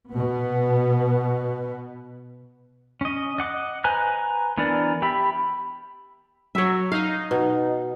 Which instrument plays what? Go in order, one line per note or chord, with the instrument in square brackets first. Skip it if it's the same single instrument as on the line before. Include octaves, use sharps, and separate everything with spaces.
[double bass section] B2 B3
[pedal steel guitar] C#4 D#5
D#5 F#5 D6
B4 C5 G#5 A#5 F#6
E3 B3 D4 A#4 D5
G4 E5 B5
[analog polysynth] F#3 [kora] C#5 E5
[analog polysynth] D#4 [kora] F5
[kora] B2